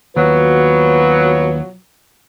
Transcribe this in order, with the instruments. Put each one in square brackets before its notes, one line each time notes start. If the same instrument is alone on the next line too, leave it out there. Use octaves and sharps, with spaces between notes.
[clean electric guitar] D#2 [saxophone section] B2 F3 F#3 [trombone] B4